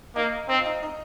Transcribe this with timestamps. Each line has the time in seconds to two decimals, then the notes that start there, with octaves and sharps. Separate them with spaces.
0.16 A#3 D#4
0.49 C4 D#4
0.59 F4
0.66 D#4
0.83 D#4